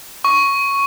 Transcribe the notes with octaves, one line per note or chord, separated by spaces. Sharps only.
C#6